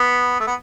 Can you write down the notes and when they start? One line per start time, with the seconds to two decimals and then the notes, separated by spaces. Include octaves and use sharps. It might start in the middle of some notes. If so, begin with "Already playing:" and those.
Already playing: B3
0.40 A3
0.47 B3